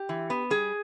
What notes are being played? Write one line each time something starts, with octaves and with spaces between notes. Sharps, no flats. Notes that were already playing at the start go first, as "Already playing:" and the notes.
Already playing: G4
E3
B3
G3 G#4